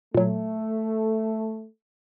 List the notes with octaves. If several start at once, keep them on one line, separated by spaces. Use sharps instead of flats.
A#2 F#3 A3